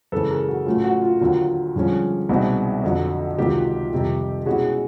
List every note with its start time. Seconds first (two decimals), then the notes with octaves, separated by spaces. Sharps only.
0.12 F#2 C#3 E3 G#3 A4 B4
0.30 G#4 A#4
0.48 F#4
0.66 A2 F#3 A3 C#4 F4
0.84 F#4
1.02 F4
1.20 D#2 D3 F#3 F4
1.76 G2 D3 F3 G#3 C#4
2.29 C2 B2 G#3 C4 D#4 F#4
2.83 F2 D3 F#3
3.38 C#2 C3 D#3 F#3 F4 G4
3.92 F2 C3 D#3 G3
4.46 B2 G#3 C#4 E4 F#4 G#4